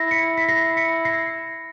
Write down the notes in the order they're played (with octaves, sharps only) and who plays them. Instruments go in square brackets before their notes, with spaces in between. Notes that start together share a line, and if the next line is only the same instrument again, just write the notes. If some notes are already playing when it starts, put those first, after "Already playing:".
Already playing: [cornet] E4 [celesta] A#6 C7
[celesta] B6 C#7
B6
A#6 C7
B6 C#7
A#6 C7